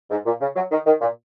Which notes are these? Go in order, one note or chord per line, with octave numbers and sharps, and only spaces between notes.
G#2
A#2
C#3
F#3
D#3
D#3
A#2